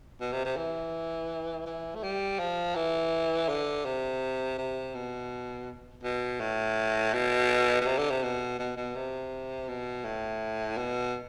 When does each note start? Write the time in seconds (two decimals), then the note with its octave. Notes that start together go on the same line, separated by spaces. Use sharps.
0.21 B2
0.32 C3
0.45 C3
0.57 E3
1.66 E3
1.96 A3
2.03 G3
2.39 F3
2.76 E3
3.49 D3
3.85 C3
4.58 C3
4.95 B2
6.04 B2
6.40 A2
7.14 B2
7.81 B2
7.86 C3
7.98 D3
8.11 C3
8.23 B2
8.59 B2
8.77 B2
8.96 C3
9.68 B2
10.05 A2
10.77 B2